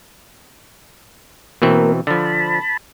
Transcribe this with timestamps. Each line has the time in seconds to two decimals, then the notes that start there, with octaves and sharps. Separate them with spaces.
1.62 B2 E3 A#3 C4 A#4
2.07 D3 F3 A5 B5